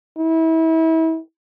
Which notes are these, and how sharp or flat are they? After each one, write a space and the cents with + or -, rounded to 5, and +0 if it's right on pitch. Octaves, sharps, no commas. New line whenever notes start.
E4 -30